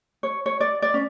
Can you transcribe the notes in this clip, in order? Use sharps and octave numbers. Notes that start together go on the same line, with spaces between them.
C#5
C#5
D5
D5
C#4